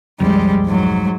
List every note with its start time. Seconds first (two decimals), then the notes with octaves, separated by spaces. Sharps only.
0.20 B1 F2 F3 G3 G#3
0.66 G#2 F#3